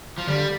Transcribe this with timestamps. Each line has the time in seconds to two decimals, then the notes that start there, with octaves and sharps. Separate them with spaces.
0.18 F3
0.27 D3 G3